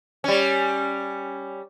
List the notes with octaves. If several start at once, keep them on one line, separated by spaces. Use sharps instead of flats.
G3 C#4